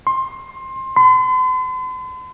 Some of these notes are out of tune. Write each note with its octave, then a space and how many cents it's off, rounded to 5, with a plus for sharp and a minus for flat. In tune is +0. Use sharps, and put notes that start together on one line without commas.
C6 +20
C6 -45